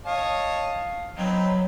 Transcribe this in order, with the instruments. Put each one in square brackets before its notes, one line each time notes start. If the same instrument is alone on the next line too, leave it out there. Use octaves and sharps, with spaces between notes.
[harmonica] C#5 D#5 A5 [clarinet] F5
[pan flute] F#3 [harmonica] B3 C4 D#4